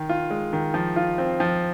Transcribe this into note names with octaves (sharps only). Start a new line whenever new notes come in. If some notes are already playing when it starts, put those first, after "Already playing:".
Already playing: D#3
F4
G#3
D#3
F3
F4
C4
F3